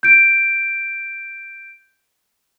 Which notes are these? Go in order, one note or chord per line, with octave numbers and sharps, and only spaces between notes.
G6 D7